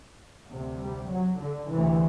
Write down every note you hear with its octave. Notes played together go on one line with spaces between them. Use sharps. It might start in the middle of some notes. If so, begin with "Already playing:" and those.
D2 C3
G3
F#3
D3
D2 C3 E3